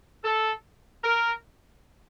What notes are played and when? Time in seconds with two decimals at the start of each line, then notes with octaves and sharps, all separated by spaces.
0.24 A4
1.04 A#4